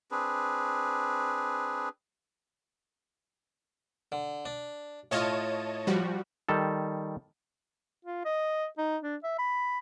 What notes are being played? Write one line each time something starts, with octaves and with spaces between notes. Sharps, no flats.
C4 D4 G#4 B4
D3
D4
A2 F4 C#5 D#5 A5
F3 G3 F#4
D#3 G3 A4
F4
D#5
D#4
D4
E5
B5